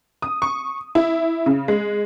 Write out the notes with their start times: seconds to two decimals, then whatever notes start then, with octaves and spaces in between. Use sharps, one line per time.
0.22 D#6
0.42 C#6
0.95 E4
1.46 C#3
1.68 G#3